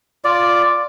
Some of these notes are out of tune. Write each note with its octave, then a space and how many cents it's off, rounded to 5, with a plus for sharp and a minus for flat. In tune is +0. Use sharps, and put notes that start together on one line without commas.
F4 +0 D5 +0